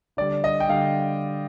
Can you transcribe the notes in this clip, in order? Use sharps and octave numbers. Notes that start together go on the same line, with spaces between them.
D3 G3 D5
D#5
G5
D3 G3 F5